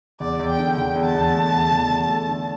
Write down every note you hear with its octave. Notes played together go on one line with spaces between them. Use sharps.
E2 D5
E2
G5
D3
E2 G5
E2
A5
E2
A3
E2
E2
E2
A3
D3